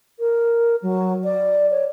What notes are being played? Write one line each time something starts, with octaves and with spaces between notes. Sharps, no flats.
A#4
F#3
D5
C#5